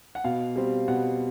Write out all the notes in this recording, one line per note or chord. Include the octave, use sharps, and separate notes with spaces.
F#5
B2 F5
G3 C4
B2 F#5